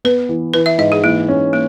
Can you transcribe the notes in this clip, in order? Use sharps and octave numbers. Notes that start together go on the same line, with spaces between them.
B3 B4
E3
E3 B4
E5
G#2 D#5
G#4
E3 A#3
C#4
A#3